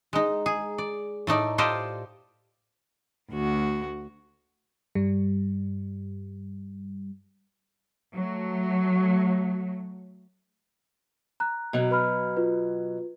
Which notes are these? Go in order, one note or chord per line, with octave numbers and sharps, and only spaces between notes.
G#3 D#4
G#4
D5
A2 A3 D#4 D5
F4 G4 A4 C5 D5 D#5
D2 F#4
G2 G3
F#3 A3
A#5 F#6
B2 F#3
B4 B5 F6
F4 B4